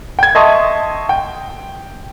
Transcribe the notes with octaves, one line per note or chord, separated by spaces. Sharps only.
G5 G#6
D#5 E5 A5 C6 C#6 D#6
G5